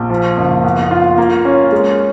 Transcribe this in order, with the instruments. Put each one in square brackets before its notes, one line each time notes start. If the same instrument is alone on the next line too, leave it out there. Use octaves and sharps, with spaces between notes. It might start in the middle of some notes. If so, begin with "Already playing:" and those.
Already playing: [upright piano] A#1
F3
F#1
B3
F4
A#3
C#4
G#3